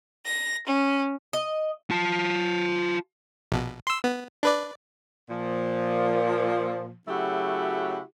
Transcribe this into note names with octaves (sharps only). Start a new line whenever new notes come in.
A#6
C#4
D#5
F4 A5
A#1 B2
C6 E6
B3
D4 B4 D5
A#2 F3
C#3 F#3 A3 E4 F#4 G4